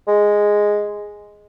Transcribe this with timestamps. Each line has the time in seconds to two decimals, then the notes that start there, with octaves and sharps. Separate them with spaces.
0.07 G#3